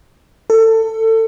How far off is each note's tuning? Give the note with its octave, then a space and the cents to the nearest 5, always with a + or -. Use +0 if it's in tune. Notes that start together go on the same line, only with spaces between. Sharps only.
A4 +25